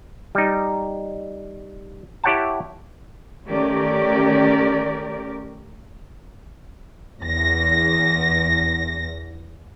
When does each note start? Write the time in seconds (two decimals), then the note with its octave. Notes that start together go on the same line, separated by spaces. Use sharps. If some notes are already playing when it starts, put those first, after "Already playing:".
0.35 G3 D#4
2.24 E4 G4 C#5 F#5 G5 A5
3.47 D#3 A3 C#4 G4 A#4 D5
7.23 E2 A#6